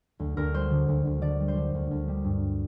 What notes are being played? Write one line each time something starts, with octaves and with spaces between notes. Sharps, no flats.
D2
D2 A#4
G3 C5
D3
D2
D2
D3 D5
G3
C5
D3
D2
D2
G3
G2